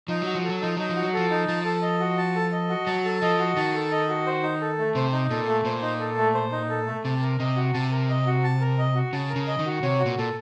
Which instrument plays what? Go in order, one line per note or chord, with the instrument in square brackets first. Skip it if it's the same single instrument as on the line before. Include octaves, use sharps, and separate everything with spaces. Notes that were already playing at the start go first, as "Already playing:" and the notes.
[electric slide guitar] F3 [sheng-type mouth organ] D#4
[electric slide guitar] F#3 [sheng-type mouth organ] F#4
[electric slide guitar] F3
[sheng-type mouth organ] A4
[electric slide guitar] F#3
[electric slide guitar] F3 [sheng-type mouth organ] D#4
[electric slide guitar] F#3 [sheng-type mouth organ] D#4
[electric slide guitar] F3
[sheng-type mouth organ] F#4
[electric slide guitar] F#3
[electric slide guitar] F3 [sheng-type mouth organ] A4
[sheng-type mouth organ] D#4
[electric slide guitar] F3 [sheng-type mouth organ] A5
[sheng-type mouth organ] A4
D#5
F#4
A5
A4
D#5
F#4
[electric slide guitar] F#3 [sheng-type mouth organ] A5
[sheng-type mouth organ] A4
[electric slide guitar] F3 [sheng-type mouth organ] D#5
[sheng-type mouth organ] F#4
[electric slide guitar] D#3 [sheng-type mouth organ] A5
[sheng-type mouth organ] A4
D#5
F#4
C5
D#4
A4
A3
[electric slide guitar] C3 [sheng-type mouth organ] C5
[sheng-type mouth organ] D#4
[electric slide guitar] A#2 [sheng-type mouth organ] A4
[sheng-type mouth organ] A3
[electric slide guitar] A#2 [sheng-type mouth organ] C5
[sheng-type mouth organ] D#4
A4
A3
C5
D#4
A4
A3
[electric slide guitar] C3 [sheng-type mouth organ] A5
[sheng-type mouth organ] A#4
[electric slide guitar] C3 [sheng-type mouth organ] D#5
[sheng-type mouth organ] F#4
[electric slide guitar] C3 [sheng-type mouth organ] A5
[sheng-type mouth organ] A#4
D#5
F#4
A5
A#4
D#5
F#4
[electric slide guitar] C#3 [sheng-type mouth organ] A5
[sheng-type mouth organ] A#4
[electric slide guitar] C#3
[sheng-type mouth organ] D#5
[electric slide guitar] D#3
[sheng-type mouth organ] F#4
[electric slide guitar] C3 [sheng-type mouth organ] C#5
[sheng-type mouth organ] F#4
[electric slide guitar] A#2
[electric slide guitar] A#2 [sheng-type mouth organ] A4